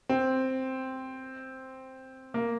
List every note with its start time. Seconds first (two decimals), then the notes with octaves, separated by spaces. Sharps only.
0.09 C4
2.34 A#3